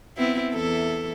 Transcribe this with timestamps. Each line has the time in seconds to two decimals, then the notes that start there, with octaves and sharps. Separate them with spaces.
0.17 B3 C4 E4
0.53 E2 E4 A4